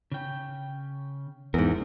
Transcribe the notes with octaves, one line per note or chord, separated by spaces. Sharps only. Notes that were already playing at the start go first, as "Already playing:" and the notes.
C#3 G5
E2 G#2 D4 A#4